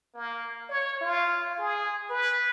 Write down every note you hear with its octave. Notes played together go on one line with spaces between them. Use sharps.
A#3
C#5
F4
G#4
B4